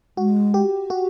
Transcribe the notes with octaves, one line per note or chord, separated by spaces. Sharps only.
G#3 F#4
G4
F#4